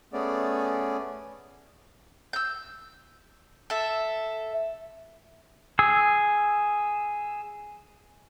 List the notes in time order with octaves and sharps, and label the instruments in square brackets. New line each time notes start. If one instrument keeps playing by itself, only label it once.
[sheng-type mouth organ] A3 B3 C#4 G#4 D5
[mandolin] E6 G6
A4 E5
[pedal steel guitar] G#4 E6